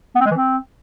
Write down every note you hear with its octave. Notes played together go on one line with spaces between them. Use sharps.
B3
C4
G#3
E3
C4